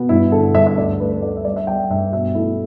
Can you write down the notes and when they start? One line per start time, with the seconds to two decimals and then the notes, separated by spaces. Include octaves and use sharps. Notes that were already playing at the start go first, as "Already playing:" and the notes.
Already playing: B2 B3
0.09 G2 E4
0.32 D3 A4
0.55 G2 E5
0.67 E5
0.78 D2 D5
1.00 A3 B4
1.12 B4
1.22 D2 D5
1.37 E5
1.45 G3 D5
1.56 E5
1.67 G3 G5
1.90 G2 E5
2.12 B2 E5
2.35 A3 E4